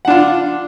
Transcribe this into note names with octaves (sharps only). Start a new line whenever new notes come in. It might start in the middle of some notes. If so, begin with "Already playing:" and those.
D4 F4 F#5